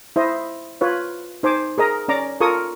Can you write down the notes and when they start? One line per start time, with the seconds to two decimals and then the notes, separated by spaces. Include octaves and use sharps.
0.16 E4 C5 D#5
0.81 F4 B4 C#5
1.43 D#4 C5 G#5 D6
1.78 G#4 A#4 D#5 A#5
2.08 C#4 D5 A#5 D6
2.41 F4 A4 A#4 C#6 D#6